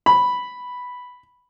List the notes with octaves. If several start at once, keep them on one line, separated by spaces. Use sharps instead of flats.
B5